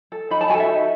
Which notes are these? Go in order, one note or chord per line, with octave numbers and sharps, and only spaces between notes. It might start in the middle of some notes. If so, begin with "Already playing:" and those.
A4
D#4 B5
A5
F#4 A4 G#5
E5
D#4